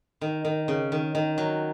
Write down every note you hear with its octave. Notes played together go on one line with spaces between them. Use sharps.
D#3
D#3
C#3
D#3
D#3
F#3